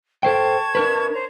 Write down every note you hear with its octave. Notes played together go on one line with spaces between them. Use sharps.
A4 C5 G5 A5 C#6 G#6
D4 A#4 B4
C5 C#5 A#5